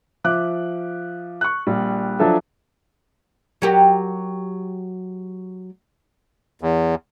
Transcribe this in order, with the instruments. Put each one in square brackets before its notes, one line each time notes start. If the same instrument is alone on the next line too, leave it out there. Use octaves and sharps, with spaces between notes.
[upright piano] F3 E5 D6 F#6
C#6 F#6
A#1 G3
F3 F#3 D4 A4 E5
[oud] F#3 G4 A#4
[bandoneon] E2